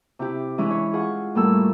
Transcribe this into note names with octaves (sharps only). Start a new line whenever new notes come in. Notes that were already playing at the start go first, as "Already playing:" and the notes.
C3 E4 G4
E3 G#3 C#4 D4 E4
C#5
F4 G#4 F#5 C#6
A2 G3 A#3 A4 E6